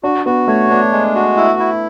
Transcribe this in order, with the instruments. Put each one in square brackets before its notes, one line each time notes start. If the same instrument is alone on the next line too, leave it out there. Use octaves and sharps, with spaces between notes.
[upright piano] D4 [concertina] F#4
[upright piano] B3 [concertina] F#4
[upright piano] A3 [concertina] C#5
[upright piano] B3 [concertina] D4
[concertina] G#3
F#4
E4
E4